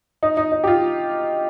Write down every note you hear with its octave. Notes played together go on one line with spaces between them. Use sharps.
D#4
D#4
D#4
G4
F4